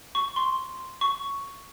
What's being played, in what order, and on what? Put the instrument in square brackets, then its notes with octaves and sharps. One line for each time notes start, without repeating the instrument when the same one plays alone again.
[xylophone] C#6
C6
C#6